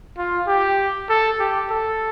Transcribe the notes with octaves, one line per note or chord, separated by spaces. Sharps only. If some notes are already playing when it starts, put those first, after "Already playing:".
F4
G4
A4
G4
A4